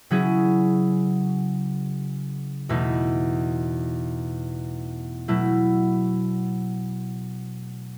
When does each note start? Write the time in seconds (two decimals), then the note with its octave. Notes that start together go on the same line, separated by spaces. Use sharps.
0.10 C#3 F#3 C#4 E4 G#4
2.69 E2 B2 A3 D#4
5.28 B2 F#3 A3 E4